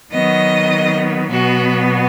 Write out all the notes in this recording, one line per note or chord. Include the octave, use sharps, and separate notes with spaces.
D#3 F#3 B3 D#5
B2 F#3 B3 F#4